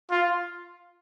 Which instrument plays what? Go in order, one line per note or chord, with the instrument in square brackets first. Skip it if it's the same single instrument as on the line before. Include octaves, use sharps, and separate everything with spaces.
[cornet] F4